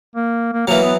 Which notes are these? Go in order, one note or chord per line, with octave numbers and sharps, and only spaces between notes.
A#3
A#3
E3 F#3 A#3
B3